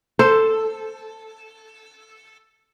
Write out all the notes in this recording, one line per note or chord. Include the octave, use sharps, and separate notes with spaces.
A4 C5